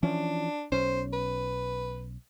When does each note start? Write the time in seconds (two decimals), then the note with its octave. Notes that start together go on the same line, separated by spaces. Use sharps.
0.03 E3 F3 C#4 D4
0.72 B1 C#4 C5
1.13 B4